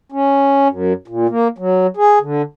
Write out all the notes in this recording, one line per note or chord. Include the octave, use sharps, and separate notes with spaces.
C#4
F#2
A#2
A#3
F#3
G#4
D3